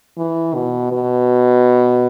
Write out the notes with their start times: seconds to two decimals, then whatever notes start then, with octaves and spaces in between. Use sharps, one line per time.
0.17 E3
0.55 B2
0.92 B2